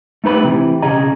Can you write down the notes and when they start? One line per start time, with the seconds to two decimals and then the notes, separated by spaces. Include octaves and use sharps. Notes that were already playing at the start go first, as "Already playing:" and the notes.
0.24 A3 D#4 B4 B5
0.44 C3 D#3 E3
0.82 B1 C#3 G#4 D#5 A#5